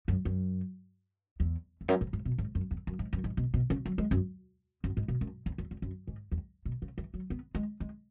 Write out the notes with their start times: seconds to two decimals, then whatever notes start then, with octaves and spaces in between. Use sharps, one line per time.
0.08 F#2
0.25 F#2
1.40 E2
1.81 E2
1.88 F#2
2.01 G#2
2.13 G#2
2.25 B2
2.38 G#2
2.55 F#2
2.71 E2
2.87 F#2
2.99 G#2
3.13 F#2
3.24 G#2
3.37 B2
3.54 B2
3.70 C#3
3.86 F#3
3.98 G#3
4.11 F#2
4.84 F#2
4.97 G#2
5.08 B2
5.21 F#2
5.46 E2
5.58 E2
5.71 E2
5.82 F#2
6.07 G#2
6.32 E2
6.66 B2
6.82 C#3
6.98 E3
7.14 F#3
7.30 B3
7.55 G#3
7.80 G#3